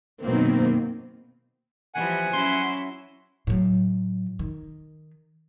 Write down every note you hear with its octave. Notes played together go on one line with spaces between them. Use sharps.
F#2 B2 D#3 F#3 A#3 C4
E3 F3 G3 F#5 G#5
F#3 C#4 E4 C6
A2 F#3
D#3